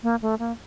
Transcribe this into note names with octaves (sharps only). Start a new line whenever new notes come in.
A#3
A3
A#3